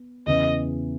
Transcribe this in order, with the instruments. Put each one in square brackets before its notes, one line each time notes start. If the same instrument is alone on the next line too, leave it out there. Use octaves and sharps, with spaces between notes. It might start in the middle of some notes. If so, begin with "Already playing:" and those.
Already playing: [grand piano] B3
[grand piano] E2 C#3 E3 [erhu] D#5